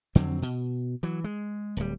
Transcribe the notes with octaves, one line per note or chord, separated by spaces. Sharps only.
F2 D3 F#3 C4
B2
E3 F#3
G#3
D1 G3